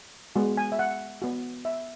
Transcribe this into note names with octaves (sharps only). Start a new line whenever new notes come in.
G#3 B3 F#4
G#5
E5
F#5
B3 F#4
E5